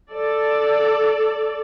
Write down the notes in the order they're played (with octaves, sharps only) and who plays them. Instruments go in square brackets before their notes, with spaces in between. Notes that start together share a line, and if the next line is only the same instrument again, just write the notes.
[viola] A4 D5